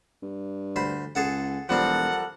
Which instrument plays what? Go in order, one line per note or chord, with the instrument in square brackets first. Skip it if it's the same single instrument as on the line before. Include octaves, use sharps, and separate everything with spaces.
[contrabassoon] G2
[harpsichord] D2 C5 B5
[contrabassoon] C#2 [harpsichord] G#4 A4 F#5
[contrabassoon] E1 [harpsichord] F3 G3 C4 [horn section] A4 A#4 F#5